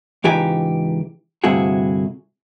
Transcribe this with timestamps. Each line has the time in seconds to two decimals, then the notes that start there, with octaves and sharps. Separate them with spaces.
0.24 C#2 G#2 E3 D#4 G4 G#5
1.44 D2 G2 C3 E4 F#4 G#4